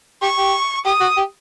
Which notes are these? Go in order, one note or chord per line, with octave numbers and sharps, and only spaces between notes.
G4 C#6
G4
G4 D#6
F#4
G4